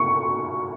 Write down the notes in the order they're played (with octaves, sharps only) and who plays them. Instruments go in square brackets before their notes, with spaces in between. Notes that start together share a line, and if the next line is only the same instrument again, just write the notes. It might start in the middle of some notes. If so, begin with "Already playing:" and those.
Already playing: [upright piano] C#6